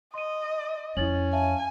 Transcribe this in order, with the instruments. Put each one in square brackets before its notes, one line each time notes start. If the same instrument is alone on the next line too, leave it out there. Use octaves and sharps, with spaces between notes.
[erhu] D#5 [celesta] C6 D#7
[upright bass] F2 [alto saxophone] C#4 [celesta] E4 A6 F#7
[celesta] E5 F5 A5 [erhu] G#5